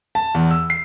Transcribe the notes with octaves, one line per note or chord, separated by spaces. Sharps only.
A5
E2
E6
C7